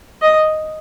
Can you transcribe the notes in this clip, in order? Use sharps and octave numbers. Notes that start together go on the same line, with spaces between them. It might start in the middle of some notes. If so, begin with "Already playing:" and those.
D#5